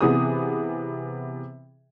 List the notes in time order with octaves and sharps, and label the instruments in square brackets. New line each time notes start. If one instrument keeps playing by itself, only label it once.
[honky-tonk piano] C3 E3 B3 G#4 D#6